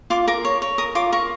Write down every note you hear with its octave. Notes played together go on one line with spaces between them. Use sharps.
F4 D6
A#4 D6
C#5
C#5
A#4 D#6
F4 D6
A#4 C#6